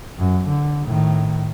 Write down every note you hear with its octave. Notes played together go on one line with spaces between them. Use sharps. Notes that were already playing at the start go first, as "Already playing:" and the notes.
F#2
D3
A2 D#3